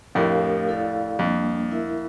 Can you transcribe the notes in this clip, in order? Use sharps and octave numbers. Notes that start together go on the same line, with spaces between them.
F2 A2 A3 D4 G4 A#4 F5
E4 A4 D5 F5
F2 G3 A#3 D4
E4 A#4 E5